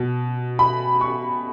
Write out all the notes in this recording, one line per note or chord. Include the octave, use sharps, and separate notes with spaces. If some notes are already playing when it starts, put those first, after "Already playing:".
Already playing: B2
B5
C#6